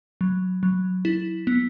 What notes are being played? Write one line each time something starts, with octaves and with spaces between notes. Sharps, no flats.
F#3
F#3
E4
B3